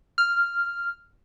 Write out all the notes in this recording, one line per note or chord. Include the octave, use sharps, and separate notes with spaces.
F6